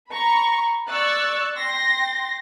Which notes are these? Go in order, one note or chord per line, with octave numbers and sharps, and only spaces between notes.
A#5 B5 C#6
D5 C#6 E6 F#6 A6
G5 C6 A#6